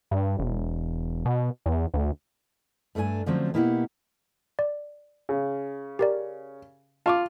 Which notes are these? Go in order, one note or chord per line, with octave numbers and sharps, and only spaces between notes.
G2
E1
B2
E2
D2
G2 A3 D4 G4 G#5
D3 F3 F#3 A3 C4 C#4
B2 A#3 E4 G4 D5 F#5
D5
C#3
G4 A#4 D5
F4 A5 C#6 D6